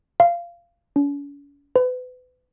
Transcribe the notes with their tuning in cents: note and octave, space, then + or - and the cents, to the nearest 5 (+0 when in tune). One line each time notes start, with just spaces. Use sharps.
F5 -20
C#4 +45
B4 +35